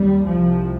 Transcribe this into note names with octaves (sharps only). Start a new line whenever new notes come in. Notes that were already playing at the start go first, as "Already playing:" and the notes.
Already playing: D#2 G3
C2 C3 F3